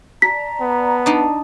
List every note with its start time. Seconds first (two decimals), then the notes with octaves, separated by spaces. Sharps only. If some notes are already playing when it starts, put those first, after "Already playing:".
0.22 D5 A5 A#5 B6
0.61 B3
1.06 D4 D#4